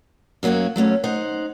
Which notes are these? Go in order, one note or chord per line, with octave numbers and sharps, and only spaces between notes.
F#2 F#3 A#3 C#4 F#4
F#3 A3 C4 C#4
D#4 C5 F#5